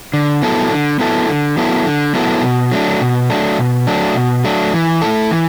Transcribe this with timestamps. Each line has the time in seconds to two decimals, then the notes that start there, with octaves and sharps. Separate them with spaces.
0.13 D3
0.42 F#3 B3 E4 A4
0.71 D3
0.99 F#3 B3 E4 A4
1.29 D3
1.57 F#3 B3 E4 A4
1.87 D3
2.15 F#3 B3 E4 A4
2.44 B2
2.72 F#3 A3 D4
3.01 B2
3.30 F#3 A3 D4
3.58 B2
3.87 F#3 A3 D4
4.15 B2
4.44 F#3 A3 D4
4.74 E3
5.01 A3 E4 A4
5.31 E3